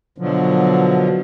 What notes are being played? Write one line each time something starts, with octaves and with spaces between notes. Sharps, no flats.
B2 D3 F3 F#3